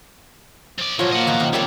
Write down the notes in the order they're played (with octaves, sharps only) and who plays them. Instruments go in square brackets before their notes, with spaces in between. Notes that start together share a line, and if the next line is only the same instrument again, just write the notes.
[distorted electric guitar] F3 D5
[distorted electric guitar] C2 [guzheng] A#2 F#3 [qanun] F3 [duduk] C#5
[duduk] A#3 [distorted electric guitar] D#5 F#5
[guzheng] E2 B2 F#3
C3 D#3 C#4
[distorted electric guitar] C3 C4 [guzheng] G3 A3 A4 [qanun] A#3 A#4 C#5